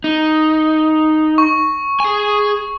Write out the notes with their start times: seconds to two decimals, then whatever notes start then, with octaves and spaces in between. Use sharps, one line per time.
0.04 D#4
1.38 C#6
2.00 G#4 G#5